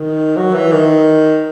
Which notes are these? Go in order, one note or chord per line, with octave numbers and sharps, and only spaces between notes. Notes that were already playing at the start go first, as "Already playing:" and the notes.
Already playing: D#3
F#3
E3
D#3